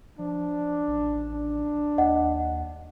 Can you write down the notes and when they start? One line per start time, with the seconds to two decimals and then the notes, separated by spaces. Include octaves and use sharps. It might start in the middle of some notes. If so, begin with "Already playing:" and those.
0.19 F3 D4
0.88 A1
1.33 D4
1.98 D#2 D#5 F#5